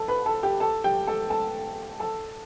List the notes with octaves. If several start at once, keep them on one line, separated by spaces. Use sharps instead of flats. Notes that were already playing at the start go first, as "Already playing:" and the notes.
Already playing: A4 A5
B4 B5
A4 A5
G4 G5
A4 A5
G4 G5
A4 A5
A4 A5
A4 A5